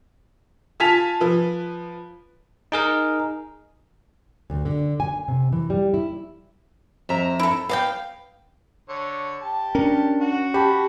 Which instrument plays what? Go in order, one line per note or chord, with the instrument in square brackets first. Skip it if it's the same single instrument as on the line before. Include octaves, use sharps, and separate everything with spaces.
[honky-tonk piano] F4 G#5 A5 B6 F7
F3 B4
[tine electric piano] D#4 G#4 A#4
[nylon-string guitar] D2
D3
G#5
C3
E3
G3
E4
[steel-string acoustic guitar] F2 E5 A#5
[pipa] E4 A4
[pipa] B3 D5 G5 [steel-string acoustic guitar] F5
[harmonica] D3 C#5
G4 A5
[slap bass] C#4 [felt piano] D4 [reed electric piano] A#4
[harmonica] F#4
[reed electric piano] G4 A5 [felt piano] B5